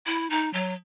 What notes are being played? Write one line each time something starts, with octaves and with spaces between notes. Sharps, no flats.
E4
D#4
F#3